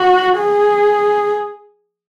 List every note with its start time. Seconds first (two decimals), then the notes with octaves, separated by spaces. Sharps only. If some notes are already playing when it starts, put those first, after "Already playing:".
Already playing: F#4
0.38 G#4